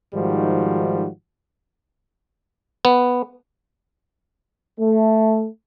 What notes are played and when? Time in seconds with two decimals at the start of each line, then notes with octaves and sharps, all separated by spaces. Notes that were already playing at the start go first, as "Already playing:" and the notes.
0.15 G#2 D#3 F3 G3 F#4
2.85 B3
4.80 A3